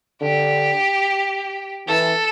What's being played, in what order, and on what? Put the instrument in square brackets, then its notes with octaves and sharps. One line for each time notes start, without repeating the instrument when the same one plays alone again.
[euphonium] D3 [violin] G4
[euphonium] E3 [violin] A4